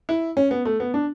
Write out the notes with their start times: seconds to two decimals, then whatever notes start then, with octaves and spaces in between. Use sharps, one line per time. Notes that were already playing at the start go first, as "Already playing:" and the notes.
0.09 E4
0.37 C#4
0.51 B3
0.65 A3
0.80 B3
0.94 D4